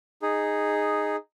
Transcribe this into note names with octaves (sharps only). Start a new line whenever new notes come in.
D#4 G#4